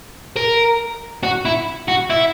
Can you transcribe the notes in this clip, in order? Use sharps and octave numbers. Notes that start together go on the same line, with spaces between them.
A#4
F#4
E4
F#4
E4